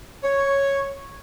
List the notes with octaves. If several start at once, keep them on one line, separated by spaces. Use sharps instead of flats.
C#5